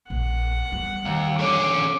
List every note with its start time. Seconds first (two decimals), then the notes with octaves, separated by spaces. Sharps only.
0.10 A#1 F#5
0.72 G3
1.05 D#2
1.39 D3 C#4 D6